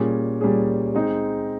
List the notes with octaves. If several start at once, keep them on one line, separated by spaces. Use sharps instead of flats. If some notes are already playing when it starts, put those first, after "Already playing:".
Already playing: A#2 G3 C#4 G#4
A#2 G3 C#4 G#4
G#3 C4 D#4